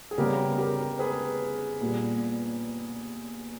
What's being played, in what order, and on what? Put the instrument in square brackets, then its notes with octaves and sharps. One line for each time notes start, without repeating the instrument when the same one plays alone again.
[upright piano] G#4
[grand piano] C#3 G3 B3 [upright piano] G4 A#4
[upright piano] G4 A#4
G#4 B4
[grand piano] A#2 G3 B3